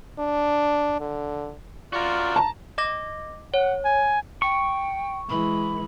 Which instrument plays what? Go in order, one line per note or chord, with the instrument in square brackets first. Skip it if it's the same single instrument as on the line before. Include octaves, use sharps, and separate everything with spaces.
[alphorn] D4
D3
[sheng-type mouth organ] F4 D5 [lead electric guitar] F#4 A#4
[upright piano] A5 A#5
[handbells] D#5 D6 A#6
[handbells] C#5 [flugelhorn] F#5
[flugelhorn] G#5
[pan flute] G5 [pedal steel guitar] C#6
[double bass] E3 G#3 [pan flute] B5